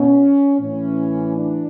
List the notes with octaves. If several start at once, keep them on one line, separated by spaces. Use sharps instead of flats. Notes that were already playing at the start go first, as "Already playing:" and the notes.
Already playing: B2 C#4
A2 E3 C#4
D4